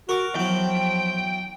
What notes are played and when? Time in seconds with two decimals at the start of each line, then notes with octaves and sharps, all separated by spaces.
0.09 F#4 A#4 D6
0.35 E2 F3 F#3 G5